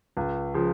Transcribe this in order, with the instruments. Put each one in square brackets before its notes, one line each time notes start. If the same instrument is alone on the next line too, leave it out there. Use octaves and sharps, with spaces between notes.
[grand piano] C#2
C#3 F3